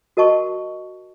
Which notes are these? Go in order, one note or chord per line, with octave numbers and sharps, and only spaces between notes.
F#4 A#4 D#5 A5 C#6